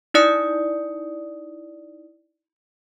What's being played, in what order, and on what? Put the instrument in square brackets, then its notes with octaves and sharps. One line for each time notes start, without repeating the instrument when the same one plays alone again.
[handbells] D#4 E4 D5 D#6 C#7